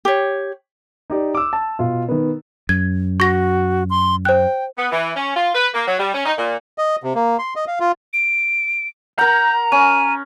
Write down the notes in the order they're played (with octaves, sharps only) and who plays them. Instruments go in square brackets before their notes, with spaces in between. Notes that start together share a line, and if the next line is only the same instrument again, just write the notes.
[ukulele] G4 C#5
[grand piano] D#4 G4 D5
D6 E6
A5
B2 F4
D#3 B3
[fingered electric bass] F#2 [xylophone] G#6
[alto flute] F#4 [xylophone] C#6 A#6
[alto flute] C6
[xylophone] C5 F#6 [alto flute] G5
[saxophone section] B3
E3
C#4
F4
B4
A#3
F#3
G3
C#4
D#4
A#2
[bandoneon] D#5
C3
A#3
C6
D#5
F5
F4
[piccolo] D7
[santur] A#4 F#5 [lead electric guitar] A#5 [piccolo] G6
[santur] C#4 [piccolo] D#7